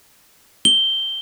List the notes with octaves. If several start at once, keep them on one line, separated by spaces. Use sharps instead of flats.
G7